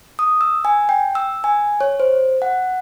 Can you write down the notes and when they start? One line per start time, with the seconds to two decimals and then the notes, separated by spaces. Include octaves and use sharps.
0.19 D#6
0.41 E6
0.65 G#5
0.89 G5
1.15 E6
1.44 G#5
1.81 C#5
2.00 C5
2.42 F#5